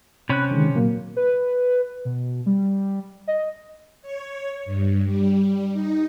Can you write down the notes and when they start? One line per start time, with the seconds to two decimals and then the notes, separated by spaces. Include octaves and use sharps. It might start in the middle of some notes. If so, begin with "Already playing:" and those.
0.29 C3 C#4 B5 F#6
0.51 D3 D#3 G#3
0.74 A#2 F#3 A#3
1.16 B4
2.05 B2
2.46 G3
3.27 D#5
4.02 C#5
4.65 G2
5.05 G3
5.73 D#4